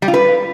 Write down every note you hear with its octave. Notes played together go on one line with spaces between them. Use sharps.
G3
F4
B4